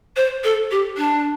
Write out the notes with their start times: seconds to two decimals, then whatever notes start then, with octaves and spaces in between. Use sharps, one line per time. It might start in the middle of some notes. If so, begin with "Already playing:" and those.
0.16 C5
0.43 A4
0.71 G4
0.97 D4